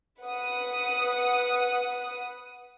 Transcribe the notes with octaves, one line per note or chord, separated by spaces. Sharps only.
B4 F#5 D#6